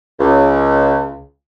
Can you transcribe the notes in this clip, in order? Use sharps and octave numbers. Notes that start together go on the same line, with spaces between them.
C#2